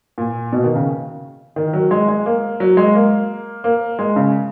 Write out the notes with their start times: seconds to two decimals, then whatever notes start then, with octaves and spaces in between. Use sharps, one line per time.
0.18 A#2
0.53 B2
0.64 D#3
0.76 C#3
1.56 D#3
1.73 F#3
1.91 G#3
2.08 G#3
2.26 A#3
2.60 F#3
2.77 G#3
2.95 A#3
3.64 A#3
3.99 G#3
4.16 C#3